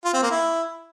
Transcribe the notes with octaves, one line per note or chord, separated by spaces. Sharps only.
F4
C4
A#3
E4